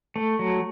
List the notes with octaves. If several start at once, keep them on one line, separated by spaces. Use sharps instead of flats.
A3
F#3